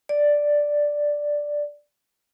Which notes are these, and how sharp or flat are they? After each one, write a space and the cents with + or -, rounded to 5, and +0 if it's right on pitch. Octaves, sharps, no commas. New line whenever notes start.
D5 +0